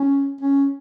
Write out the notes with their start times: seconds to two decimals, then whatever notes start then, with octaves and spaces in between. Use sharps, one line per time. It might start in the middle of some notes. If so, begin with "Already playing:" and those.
Already playing: C#4
0.41 C#4